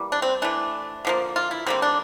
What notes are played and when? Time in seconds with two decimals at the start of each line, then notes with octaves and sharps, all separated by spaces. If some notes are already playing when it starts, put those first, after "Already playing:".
Already playing: E3 G3 A#3
0.12 D4
0.22 C4
0.42 E3 A3 D4
1.05 D3 F3 A#3
1.36 F4
1.51 E4
1.67 D3 G3 A#3 C4
1.82 D4